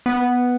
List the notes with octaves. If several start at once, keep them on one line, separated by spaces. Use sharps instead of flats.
B3